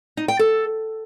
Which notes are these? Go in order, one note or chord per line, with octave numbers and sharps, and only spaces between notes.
D#4
G5
A4